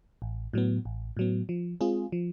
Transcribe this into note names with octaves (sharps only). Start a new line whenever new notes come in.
A1
A2 F#3 B3
A1
A2 F#3 B3
F3
G#3 C4 F4 G#4
F3